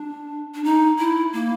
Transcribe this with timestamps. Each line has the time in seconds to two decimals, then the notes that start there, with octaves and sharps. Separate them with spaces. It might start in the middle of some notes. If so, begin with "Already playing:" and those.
Already playing: D4
0.54 D4
0.64 D#4
0.99 E4
1.33 A#3